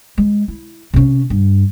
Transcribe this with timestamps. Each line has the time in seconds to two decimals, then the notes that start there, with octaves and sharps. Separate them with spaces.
0.18 G#3
0.48 E4
0.94 C3 C#4
1.30 G2